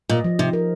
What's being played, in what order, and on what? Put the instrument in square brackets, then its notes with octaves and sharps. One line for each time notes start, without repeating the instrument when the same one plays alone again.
[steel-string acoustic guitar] A#2 [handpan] D#5
[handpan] F3
[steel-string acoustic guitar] C3 [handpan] D#4
[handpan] A#4